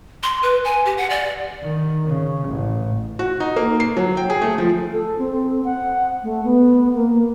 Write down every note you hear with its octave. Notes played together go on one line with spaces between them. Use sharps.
C6
B4
G#5
G4
F#5
D5
D#3
C#3
A1
F#4
D#4
A#3
C7
F#3
G5
G#4
A3
F3
A4
C4
F#5
A3
B3
A#3